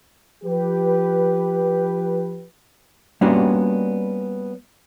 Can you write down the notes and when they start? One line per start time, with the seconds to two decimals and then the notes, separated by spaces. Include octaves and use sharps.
0.44 F3 G4 B4
3.21 G3 A#3 B3 C#4 D4 F#4